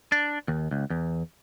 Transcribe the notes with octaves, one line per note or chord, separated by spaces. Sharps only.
D4
D#2
C#2
E2